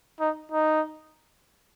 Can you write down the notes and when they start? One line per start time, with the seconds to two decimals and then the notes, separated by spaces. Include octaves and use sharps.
0.20 D#4
0.52 D#4